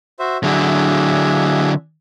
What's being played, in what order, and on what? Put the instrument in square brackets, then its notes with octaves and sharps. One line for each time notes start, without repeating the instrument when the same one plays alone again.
[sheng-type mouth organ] F#4 C5 E5
[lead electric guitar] D3 F#3 [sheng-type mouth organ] D4 G#4 E5